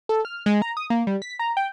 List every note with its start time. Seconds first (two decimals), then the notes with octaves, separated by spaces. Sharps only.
0.09 A4
0.25 F6
0.46 G#3
0.62 A#5
0.77 D#6
0.90 A#3
1.07 G3
1.22 B6
1.39 A#5
1.57 G5